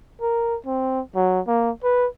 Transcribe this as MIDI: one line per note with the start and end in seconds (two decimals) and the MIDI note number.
0.21 0.57 70
0.66 1.01 60
1.15 1.40 54
1.47 1.71 58
1.83 2.07 71